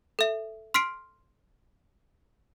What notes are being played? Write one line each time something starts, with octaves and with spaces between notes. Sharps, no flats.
A4 E5
C6 F6 B6 C7 D7